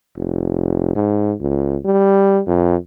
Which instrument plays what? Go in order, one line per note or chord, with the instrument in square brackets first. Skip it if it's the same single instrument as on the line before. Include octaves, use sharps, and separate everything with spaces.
[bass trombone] F1
G#2
C#2
G3
F2